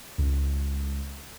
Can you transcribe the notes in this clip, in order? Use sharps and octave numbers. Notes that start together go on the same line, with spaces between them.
C#2